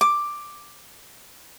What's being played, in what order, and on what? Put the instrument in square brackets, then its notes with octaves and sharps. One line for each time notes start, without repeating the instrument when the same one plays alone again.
[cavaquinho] D6